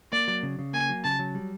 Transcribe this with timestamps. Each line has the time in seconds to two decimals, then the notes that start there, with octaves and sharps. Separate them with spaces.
0.13 A#3 D5
0.28 F#3
0.43 C#3
0.59 C#3
0.73 A#3 G#5
0.89 F#3
1.05 C#3 A5
1.19 F#3
1.35 G3